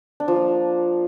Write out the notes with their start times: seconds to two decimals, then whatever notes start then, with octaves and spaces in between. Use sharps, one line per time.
0.20 D4
0.28 F3
0.36 A#3